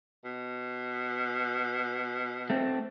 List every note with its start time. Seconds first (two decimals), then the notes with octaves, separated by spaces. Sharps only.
0.25 B2
2.50 A3 C4